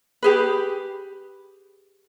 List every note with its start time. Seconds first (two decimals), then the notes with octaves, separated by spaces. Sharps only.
0.23 G4 G#4 B4